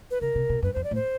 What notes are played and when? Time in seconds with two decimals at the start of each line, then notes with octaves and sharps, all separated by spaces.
0.11 B4
0.21 C#3 A#4
0.35 C3
0.50 B2
0.62 F#2 B4
0.73 F2 C5
0.84 D5
0.91 A2
0.95 C5